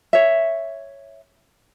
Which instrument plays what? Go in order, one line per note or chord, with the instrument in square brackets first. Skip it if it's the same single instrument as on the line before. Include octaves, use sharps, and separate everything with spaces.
[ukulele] C#5 E5